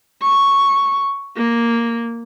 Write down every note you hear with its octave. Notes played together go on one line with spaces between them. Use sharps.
C#6
A#3